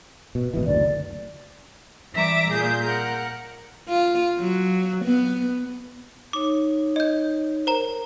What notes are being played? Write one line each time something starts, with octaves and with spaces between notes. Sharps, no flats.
B2
G#1 B2 E3
F#1 D2 D5
E3 G3 E5 A#5 D6
A#2 G#4 G6
A#4 F#5
F4
F#3
B3
D#4 C#5 D6
D#5 G6
A#4 C5 A#5